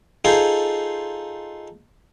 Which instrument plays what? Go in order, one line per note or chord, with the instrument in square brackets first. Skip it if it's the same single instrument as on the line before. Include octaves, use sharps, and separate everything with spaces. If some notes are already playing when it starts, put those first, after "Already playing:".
[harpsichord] D#4 F4 G#4 A4 C5